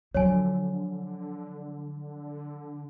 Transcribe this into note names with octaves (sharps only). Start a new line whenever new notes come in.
D3 F3 F#3 C#5 G#5